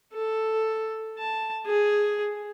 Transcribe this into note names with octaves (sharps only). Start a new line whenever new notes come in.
A4
A5
G#4